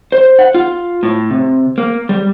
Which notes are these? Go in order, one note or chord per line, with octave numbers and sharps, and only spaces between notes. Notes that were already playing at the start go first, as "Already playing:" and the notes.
C5
F#5
F4
A2
C3
A#3
G3